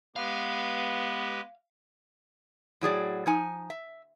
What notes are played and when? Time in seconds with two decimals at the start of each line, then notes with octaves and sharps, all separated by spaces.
0.16 G#3 B3 G4 B4 F5
2.81 A2 F#3 G#4 D5
3.26 F3 D#4 G#5
3.70 E5